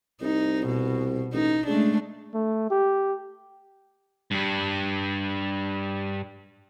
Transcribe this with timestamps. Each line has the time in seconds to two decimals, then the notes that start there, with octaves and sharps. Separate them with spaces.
0.21 C2 D#4
0.66 B2
1.33 A1 D#4
1.67 C#3 G#3 A3 D4
2.34 A3
2.70 G4
4.31 G2 G3